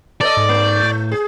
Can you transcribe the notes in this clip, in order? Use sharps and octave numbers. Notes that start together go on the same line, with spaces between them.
A4 C5 D5 D#5
G#2
A3
A2
G#4